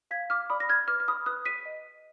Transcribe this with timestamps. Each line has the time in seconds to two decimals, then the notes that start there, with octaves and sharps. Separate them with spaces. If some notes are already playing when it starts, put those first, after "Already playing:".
0.11 F5 G#6 B6
0.30 D6 F6
0.50 D5 B5 D#6
0.60 A#6
0.69 F6 G#6
0.88 B4 D6 F6
1.00 F6
1.08 B5 D#6
1.26 B4 D#6 F#6
1.45 B6 D#7
1.65 D#5